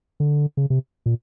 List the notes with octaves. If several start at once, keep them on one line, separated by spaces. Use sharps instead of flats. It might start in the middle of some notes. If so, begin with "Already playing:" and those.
D3
C#3
C3
A#2